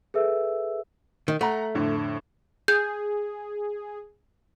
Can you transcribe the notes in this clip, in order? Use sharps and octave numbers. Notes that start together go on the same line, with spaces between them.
G#4 A4 B4 E5 E6
D#3
A3 F#5 A#5
F2 A2 D3
G#4 G6